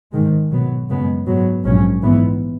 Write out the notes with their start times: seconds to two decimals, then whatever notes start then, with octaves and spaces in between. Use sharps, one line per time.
0.12 G#2 D#3 G#3
0.51 B1 B2 F#3 B3
0.88 F#2 C#3 G#3 B3
1.26 G#2 F#3 B3
1.64 A#1 G#2 F#3 C#4
2.03 G#2 E3 B3